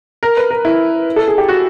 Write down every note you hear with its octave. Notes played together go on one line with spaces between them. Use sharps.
A#4
B4
A#4
E4
A4
G#4
G4
F#4